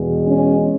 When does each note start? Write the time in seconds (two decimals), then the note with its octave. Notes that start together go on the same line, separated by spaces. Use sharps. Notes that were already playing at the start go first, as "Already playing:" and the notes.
Already playing: E2 B2 G#3
0.25 C#4